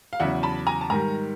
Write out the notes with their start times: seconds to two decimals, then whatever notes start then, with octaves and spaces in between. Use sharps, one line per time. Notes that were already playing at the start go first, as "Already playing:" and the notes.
0.13 F5
0.20 E2 C#3 F#3 E5 F#5
0.43 A5 B5
0.67 G#5 A#5
0.81 A5
0.90 G#2 D#3 G3 G#5 A#5